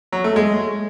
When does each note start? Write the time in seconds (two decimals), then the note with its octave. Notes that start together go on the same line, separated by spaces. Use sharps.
0.13 F#3
0.24 A3
0.36 G#3